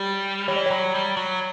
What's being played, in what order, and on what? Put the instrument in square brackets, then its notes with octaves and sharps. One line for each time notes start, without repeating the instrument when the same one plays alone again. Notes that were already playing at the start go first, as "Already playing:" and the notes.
Already playing: [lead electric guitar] G3 [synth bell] G4
[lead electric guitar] E3 [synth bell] C#5
[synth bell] D5
[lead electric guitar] F#3 [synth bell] C#5
[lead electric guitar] G3
F#3